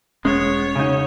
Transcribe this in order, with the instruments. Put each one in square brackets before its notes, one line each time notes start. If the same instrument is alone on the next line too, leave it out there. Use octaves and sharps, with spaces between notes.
[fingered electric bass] E1 C#4 [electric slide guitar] G#3 A#3 B3 [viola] C#5
[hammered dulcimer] F#2 F#5 [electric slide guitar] C#3 D#4